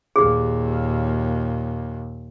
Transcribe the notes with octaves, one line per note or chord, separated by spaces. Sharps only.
D#2 A#2 G4 G#4